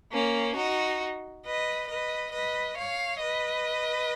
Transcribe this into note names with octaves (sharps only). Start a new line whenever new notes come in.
A#3 C#4
D#4 F#4
B4 D#5
B4 D#5
B4 D#5
C#5 F5
B4 D#5